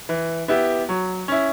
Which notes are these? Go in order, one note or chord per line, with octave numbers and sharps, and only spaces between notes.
E3
B3 E4 G4
F#3
C#4 E4